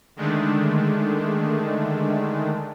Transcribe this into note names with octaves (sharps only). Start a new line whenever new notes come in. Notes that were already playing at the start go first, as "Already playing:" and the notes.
D3 D#3 G#3 A3 D4